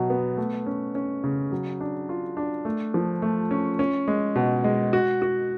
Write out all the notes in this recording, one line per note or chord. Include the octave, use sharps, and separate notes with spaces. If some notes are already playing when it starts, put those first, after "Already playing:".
Already playing: B2 F#3
B3
A3
C#4
C#4
C#3
F#3
D4
F4
D4
A3
F3
A3
C#4
C#4
G#3
B2
G#3
F#4
F#4